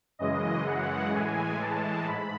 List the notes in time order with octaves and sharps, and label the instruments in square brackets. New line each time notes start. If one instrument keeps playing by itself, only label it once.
[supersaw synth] F#2 C#3 E3 G#3 D#5
F#5
A2 E3 G#3 G#5
A5
G#2 B5